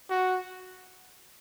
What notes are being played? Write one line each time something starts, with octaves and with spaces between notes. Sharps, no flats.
F#4